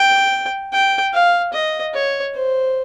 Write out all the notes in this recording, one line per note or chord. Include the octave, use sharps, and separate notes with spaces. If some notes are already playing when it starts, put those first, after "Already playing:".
Already playing: G5
G5
F5
D#5
C#5
C5